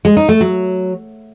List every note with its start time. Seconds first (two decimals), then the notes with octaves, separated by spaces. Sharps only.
0.05 G#3
0.17 D#4
0.29 A3
0.40 F#3